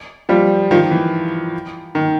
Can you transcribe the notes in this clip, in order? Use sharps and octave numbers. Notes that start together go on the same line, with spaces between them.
F3 G3
D#3 F3
E3
D#3